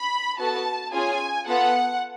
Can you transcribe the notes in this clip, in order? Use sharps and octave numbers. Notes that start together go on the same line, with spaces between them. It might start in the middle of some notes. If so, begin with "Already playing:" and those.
Already playing: B5
B3 F#4 A4 A5
C#4 F4 G#4 G#5
B3 F4 A4 F#5